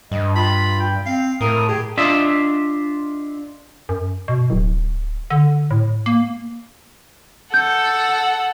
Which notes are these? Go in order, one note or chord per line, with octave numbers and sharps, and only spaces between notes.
G2 D#5
F4 B5
G5
C4 F5
A2 A#4 D#6
G4 G#4
D4 F4 D#5 E5
F#2
B2
D1
D3
A2
A#3
A4 F#5 G6